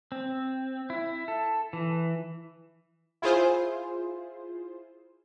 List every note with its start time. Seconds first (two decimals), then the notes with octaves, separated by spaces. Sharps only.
0.12 C4
0.90 E4
1.28 A4
1.73 E3
3.22 E4 F4 G#4 C5